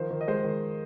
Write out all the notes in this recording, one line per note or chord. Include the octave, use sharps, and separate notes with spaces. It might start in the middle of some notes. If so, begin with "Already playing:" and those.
Already playing: D#3 F3 C5
D#3
D#5
G#3 C5
D#3